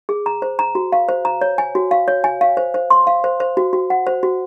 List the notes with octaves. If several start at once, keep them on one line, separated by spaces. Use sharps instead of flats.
G#4
A#5
C5
A#5
F#4
F5
C5
A#5
C#5
G#5
F#4
F5
C#5
G#5
F5
C5
C5
C6
F5
C5
C5
F#4
F#4
F#5
C5
F#4